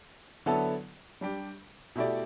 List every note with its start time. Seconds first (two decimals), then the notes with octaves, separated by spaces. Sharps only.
0.46 D3 F#3 B3 E4 A4
1.21 G3 D4 G4
1.96 B2 A3 E4 G4 D5